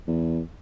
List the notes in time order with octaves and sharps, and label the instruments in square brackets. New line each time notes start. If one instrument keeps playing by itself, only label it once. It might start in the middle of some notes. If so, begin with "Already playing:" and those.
[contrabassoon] E2